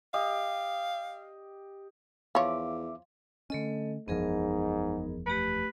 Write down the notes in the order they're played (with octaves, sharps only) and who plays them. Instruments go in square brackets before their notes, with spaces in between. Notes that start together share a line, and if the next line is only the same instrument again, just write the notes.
[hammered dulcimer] G4 D#5 [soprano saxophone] F5
[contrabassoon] E2 [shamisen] F3 C#5 [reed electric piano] E5 D6 [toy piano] F5 C6
[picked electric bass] D3 C#4 [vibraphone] A3 A4 D#5
[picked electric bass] F#1 E2 F3 [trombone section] G#2 D#4 [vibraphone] B3 G#4 A#4
[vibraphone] A3 G4 [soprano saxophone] B4